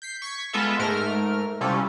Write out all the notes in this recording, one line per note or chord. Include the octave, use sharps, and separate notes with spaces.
G6 B6 C7
C#6 G#6 B6
G#3 B3 F4 A4 E5
G#2 A3 A#4 F6
C3 G3 C#4 E4 F4 A4